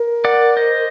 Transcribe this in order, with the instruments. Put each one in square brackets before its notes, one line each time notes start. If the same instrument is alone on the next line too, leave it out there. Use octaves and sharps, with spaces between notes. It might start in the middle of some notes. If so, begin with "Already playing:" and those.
Already playing: [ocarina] A#4
[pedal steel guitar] D5 F#5
C5 D#5